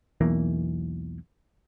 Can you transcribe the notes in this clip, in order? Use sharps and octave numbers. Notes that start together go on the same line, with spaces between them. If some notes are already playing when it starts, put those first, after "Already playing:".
B1 E2 E3 A#3